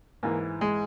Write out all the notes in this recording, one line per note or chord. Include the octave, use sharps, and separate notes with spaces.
G#2 E3 A#3
G#3